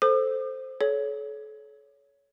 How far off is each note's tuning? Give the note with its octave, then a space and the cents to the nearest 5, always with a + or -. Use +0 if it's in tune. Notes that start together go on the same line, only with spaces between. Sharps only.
A4 +0 C5 +0 D6 +45
A4 -35 C#5 +20